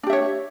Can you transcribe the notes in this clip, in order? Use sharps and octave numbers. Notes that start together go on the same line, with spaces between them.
D4 G4 C#5 E5